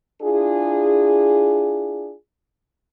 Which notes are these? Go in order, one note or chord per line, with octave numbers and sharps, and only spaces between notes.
D4 E4 F4 G#4